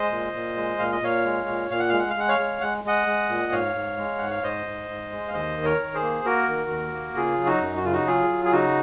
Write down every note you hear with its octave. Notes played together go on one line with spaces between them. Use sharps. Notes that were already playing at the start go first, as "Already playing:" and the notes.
Already playing: G#3 C5 D#5
A#2
A#2
G#3
A#2 F5
D#5
A#2 C#5 F5
G#3
A#2
A#2 F5
F#5
G#3 F5
F#5
F5
G#3 F#5
C#5 F5
G#3
G#3 F#5
G#3 D#5 F#5
G#3
A#2
G#2 C#5 F5
G#2
G#3
G#2 F#5
F5
G#2 C5 D#5
G#2
G#2
G#3
F5
D#2 C5 D#5
D#3
A#4 C#5
D#3
G#4 C5
A#3
A#3 F#4 A#4
D#3
D#2
A#3
C#3 F4 G#4
F#3
D#4 F#4
F#2
F#4
C#3 F4
D#4 F#4
F#3 F4 G#4
F#3
G#4
C#3 D#4 F#4